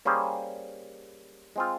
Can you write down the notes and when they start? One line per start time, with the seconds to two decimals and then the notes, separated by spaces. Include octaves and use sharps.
0.05 G3 A#3 C#4 G#4 C5
1.56 G#3 C4 F4